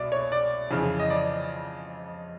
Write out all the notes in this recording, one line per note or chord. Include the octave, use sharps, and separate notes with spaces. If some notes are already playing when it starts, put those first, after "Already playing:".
Already playing: C2 B2 D5
C#5
D5
F2 C#3 E3
D#5
D5